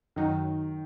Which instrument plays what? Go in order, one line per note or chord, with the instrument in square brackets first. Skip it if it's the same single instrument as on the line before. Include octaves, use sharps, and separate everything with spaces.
[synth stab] F#2 F#3 D#4 F#4 [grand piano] D#3